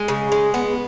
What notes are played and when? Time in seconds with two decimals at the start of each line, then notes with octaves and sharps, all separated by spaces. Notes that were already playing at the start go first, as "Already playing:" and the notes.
Already playing: G#3
0.08 C#3
0.32 G#3
0.54 B3